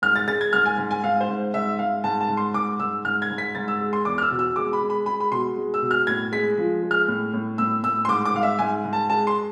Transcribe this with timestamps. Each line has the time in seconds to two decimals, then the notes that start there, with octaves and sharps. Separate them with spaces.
0.02 G#2 F6
0.16 A6
0.28 G#3 A6
0.41 G#6
0.53 G#2 F6
0.66 G#5
0.78 G#2
0.91 G#5
1.04 G#2 F5
1.20 C5
1.28 G#2
1.54 G#2 E5
1.79 G#2 F5
2.04 G#2 A5
2.21 A5
2.29 G#2
2.37 C6
2.54 G#2 D6
2.80 G#2 E6
3.05 G#2 F6
3.22 G#6
3.30 G#2
3.38 B6
3.55 G#2 A6
3.68 E6
3.81 G#3
3.93 C6
4.05 E2 D6
4.18 F6
4.22 E6
4.31 B2
4.39 E6
4.56 G#3 D6
4.73 B5
4.81 G#3
4.90 B5
5.06 G#3 B5
5.20 B5
5.31 B2 C6
5.57 G#3
5.74 E6
5.82 B2
5.91 F6
6.07 A2 G#6
6.32 G#3 B6
6.58 F3
6.83 G#3
6.91 F6
7.08 A2
7.33 A2
7.58 A2 E6
7.83 A2 E6
8.05 C6
8.08 G#2 D6
8.25 D6
8.34 G#2 F5
8.43 E5
8.59 G#2 G#5
8.85 G#2
8.93 A5
9.10 G#3 A5
9.27 C6